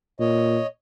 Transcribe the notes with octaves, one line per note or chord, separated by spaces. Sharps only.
A#2 C#5 D#5